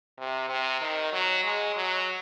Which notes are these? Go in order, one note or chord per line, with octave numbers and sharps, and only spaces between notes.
C3
C3
D#3
F#3
G#3
F#3